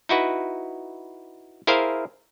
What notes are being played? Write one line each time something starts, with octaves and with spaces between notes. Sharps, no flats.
D#4 E4 F#4 B4
E4 G#4 A#4 C5 E5 F5